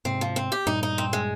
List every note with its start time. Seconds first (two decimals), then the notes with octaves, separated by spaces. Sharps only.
0.05 G#2 C3 C4
0.21 F3
0.36 C4
0.52 G4
0.67 G2 A#2 D#4
0.83 D#4
0.98 C4
1.13 G#3